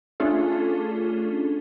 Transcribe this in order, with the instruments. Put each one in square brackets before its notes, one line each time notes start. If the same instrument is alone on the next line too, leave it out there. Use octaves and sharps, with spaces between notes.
[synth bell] A3 C#4 D4 F4 G#4 A4